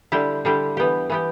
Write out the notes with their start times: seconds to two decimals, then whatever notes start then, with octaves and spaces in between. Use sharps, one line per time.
0.12 D3 G3 E4 G4
0.45 D3 G3 E4 G4
0.77 E3 B3 G4
1.10 E3 B3 G4